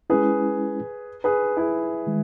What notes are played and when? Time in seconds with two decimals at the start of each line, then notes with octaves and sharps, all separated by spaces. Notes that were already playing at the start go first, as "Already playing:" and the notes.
0.10 G#3 C#4 E4 G#4 B4
1.24 G#4 B4
1.57 E4 G#4
2.07 D#3 G#3